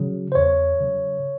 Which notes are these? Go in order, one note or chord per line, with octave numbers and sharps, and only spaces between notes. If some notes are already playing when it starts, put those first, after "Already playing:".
Already playing: C#3 F#3
C5
E2 C#5
C#3 F#3